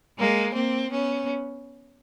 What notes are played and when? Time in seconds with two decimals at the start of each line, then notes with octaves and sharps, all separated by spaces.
0.18 G#3 A#3
0.54 A#3 C4
0.90 B3 C#4